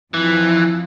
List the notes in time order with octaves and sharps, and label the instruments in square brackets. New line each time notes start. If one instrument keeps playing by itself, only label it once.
[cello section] F2 F3 [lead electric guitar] E3